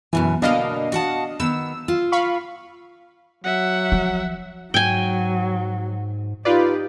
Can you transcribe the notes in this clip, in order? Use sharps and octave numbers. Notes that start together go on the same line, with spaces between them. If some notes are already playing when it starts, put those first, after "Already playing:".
F#2 B2 E3 G#5
B2 D3 A#3 D4 D#5 F5
F#4 F#5 A5
D#3 B3 E6
F4
F5 B5 C#6
F#3 E5 F#5
F3
G#2 F#3 G5 G#5
D#4 F4 G4 B4 D5